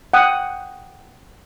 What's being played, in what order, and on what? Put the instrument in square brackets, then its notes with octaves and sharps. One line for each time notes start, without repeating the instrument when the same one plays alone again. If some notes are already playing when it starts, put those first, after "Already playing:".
[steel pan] F#5 G5 D#6